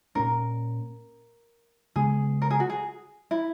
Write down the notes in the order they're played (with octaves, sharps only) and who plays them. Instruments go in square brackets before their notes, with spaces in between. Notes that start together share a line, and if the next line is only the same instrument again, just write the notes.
[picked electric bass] A#2 A#3 C#4 [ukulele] A#4
[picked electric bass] C#3 G#3 B3 [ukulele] G#4
[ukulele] A#4
G#4
F#4
G#4
E4